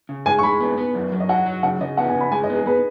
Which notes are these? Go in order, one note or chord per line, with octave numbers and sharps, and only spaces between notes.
C#3
G#3 G#5
C#6
G#3 B5
B3
B3
F#2
F#3
D#5
F#4 F#5
F#3
C#3 F#5
C#3 D#5
B3 F#5
G#5
C#3
B5
G#3 G#5
D#5
B3
G#4
B3 B4